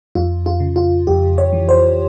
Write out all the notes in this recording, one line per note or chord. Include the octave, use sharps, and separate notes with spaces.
F2 F4
F4
C#3
F4
F2 G4
C#5
E3
C5